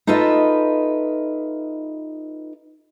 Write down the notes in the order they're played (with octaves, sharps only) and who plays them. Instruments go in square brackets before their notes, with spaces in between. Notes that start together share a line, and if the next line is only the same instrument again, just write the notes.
[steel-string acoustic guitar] D#4 F4 A4 B4 D#5 E5